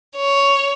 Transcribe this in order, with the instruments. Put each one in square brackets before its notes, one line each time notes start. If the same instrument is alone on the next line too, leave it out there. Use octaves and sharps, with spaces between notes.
[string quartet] C#5